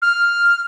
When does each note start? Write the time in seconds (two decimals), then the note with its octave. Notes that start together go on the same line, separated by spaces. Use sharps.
0.02 F6